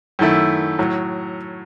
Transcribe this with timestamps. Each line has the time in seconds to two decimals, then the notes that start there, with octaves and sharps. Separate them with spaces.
0.19 F#2 D#3 A3 E4
0.79 A2 F#3